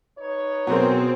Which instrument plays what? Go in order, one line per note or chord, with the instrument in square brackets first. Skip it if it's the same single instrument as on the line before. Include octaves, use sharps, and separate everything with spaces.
[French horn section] D#4 B4 C#5
[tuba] B2 [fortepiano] F#3 A#4 [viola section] C4 G#4